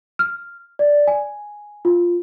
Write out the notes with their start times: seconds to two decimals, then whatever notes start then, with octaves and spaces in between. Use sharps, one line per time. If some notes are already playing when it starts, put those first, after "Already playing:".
0.19 F6
0.79 D5
1.07 G#5
1.85 F4